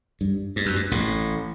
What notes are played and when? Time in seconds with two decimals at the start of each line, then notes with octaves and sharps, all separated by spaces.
0.21 G2
0.56 G2
0.66 F#2
0.76 G2
0.91 A1 A2